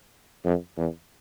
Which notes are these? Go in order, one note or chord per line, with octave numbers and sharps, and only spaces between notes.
F2
E2